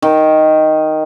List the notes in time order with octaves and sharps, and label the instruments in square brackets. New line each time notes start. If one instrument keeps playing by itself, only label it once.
[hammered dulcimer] D#3